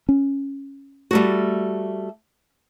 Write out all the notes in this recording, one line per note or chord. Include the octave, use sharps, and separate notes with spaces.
C#4
G3 A3 F#4